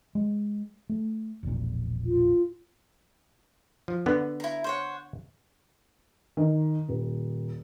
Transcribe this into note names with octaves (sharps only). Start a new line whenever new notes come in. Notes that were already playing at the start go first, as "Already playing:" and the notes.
G#3
A3
E1 A#1 A#2
F4
F3
D3 B3
E4 A#5
C5 C#5 F#5
D#3
D#1